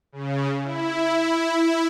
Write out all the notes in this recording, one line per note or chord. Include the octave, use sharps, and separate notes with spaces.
C#3
E4